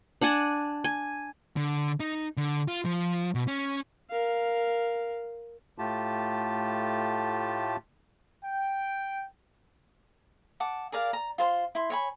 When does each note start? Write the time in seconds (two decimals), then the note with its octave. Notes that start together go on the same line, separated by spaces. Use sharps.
0.22 D4 F#5 G#5 A5
0.84 G#5
1.56 D3
2.00 D#4
2.37 D3
2.68 F4
2.85 F3
3.35 B2
3.48 C#4
4.10 A#4 F5
5.78 A2 A3 F4 G4 A5
8.43 G5
10.60 F#5 A5 D6
10.92 G#4 A#4 D5 F5
11.13 A#5
11.38 F4 C5 G#5 C6
11.75 E4 C6
11.90 C#5 G#5 B5